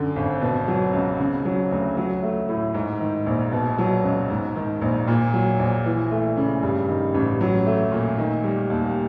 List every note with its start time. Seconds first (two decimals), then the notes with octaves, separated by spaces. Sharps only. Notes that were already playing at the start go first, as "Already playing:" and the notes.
Already playing: F#2 D3
0.16 G#1
0.42 B2
0.68 F#3
0.93 C#2
1.19 C#3
1.45 F#3
1.71 D2
1.97 F#3
2.23 A3
2.49 A2
2.74 G#2
3.00 D#3
3.26 A#1
3.52 B2
3.79 F#3
4.04 C#2
4.30 G#2
4.56 D#3
4.81 A#1
5.08 A#2
5.34 F#3
5.59 A#1
5.85 E3
6.11 A3
6.37 C#3
6.63 G2
6.89 D#3
7.14 A1
7.41 F#3
7.67 A3
7.92 A#2
8.18 D#3
8.44 G3
8.70 D#2